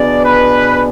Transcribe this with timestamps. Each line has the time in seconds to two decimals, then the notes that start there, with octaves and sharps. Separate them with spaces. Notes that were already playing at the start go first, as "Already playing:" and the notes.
Already playing: B2 B3 D4 G#4 D5
0.23 B4